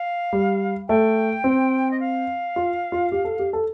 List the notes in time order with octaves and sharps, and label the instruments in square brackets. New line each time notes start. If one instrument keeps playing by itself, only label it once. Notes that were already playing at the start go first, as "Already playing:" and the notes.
Already playing: [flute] F5
[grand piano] G3
[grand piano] A3 [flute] G5
[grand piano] C4
[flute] D#5
F5
[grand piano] F4
F4
G4
A4
G4
A4